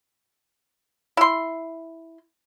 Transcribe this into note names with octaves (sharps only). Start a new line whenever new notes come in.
E4 C6